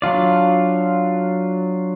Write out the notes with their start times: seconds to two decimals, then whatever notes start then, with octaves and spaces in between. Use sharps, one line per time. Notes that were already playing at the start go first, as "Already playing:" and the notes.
0.02 F#3 D4 F4 D5